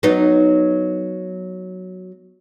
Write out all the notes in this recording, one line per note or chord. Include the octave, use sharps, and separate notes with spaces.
F#3 B3 D#4